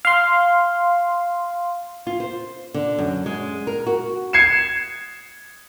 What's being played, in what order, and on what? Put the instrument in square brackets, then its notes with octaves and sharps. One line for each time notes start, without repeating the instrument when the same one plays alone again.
[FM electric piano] F5 C6
[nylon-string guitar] F4
C5
D3
F#2
G#3
A#4
F#4
[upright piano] G#6 C7 C#7 E7